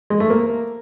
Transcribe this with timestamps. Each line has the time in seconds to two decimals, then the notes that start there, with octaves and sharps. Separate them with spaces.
0.10 G#3
0.20 A3
0.30 A#3